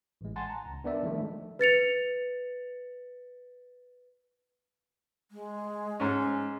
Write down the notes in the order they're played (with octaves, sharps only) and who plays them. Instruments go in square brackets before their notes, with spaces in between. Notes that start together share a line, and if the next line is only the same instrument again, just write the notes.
[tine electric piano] A1 G#3
F#5 G#5 A5 C6 A6
A#5
C#2
B3 D4 A#4 D5 E5
D#3 F3 G#3 A3 D4
[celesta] B4 A6 C#7 F7
[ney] G#3
[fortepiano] G#2 C#4